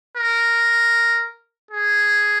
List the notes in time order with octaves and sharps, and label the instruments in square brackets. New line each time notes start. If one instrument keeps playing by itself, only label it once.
[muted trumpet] A#4
G#4